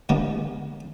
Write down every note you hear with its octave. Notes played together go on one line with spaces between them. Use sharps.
A2 D3 G3 G#3 A#3 B3